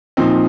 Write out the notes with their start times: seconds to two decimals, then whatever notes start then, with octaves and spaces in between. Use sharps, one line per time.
0.17 A#2 F3 C4 D#4